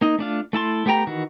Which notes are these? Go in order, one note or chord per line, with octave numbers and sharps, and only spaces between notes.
A#3 D#4 D#5
A3 D4 F4
A3 E4 A5 C6
A3 B3 G4 G5 A#5
D#3 E3 F#4